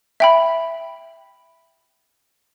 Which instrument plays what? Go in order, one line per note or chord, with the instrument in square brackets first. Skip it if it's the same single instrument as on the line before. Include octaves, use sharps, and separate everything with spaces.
[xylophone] E5 G5 B5